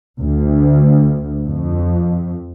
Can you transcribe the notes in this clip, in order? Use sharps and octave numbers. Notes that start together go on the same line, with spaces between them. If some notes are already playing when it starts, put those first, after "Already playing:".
D2
F2